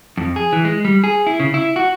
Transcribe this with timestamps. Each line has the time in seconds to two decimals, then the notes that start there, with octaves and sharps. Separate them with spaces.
0.17 F2
0.36 G#4
0.53 E3
0.65 G#3
0.85 G3
1.04 G#4
1.27 E4
1.40 C#3
1.54 E4
1.76 F#4